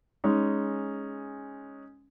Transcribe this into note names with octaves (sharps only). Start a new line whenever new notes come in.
G#3 C#4 D#4